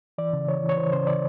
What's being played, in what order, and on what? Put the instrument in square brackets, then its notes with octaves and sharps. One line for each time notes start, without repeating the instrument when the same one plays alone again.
[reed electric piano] E3 D5
C#3
E3 C#5
E3
C#5
E3 C5
C#3 C5
E3 D5